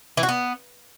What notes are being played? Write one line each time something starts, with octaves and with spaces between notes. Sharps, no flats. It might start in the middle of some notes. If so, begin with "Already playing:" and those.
E3
F#4
B3